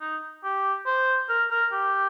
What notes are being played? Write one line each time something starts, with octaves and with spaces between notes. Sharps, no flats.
D#4
G4
C5
A#4
A#4
G4